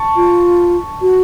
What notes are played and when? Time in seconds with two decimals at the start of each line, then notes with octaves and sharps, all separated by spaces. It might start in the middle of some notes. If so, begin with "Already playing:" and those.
Already playing: A5 C#6
0.16 F4
1.02 F#4